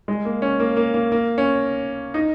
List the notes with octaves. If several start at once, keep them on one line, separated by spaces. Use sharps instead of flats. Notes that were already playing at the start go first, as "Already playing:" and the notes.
G#3
A#3
C#4
A#3
A#3
A#3
A#3
C#4
D#4